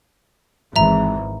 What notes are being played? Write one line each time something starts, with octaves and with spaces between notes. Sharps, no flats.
G#1 E3 E5 A#5